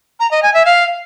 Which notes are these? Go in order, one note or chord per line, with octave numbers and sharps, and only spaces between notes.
A#5
D#5
G#5
E5
F5